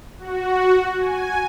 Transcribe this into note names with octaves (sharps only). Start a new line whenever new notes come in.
F#4
G#5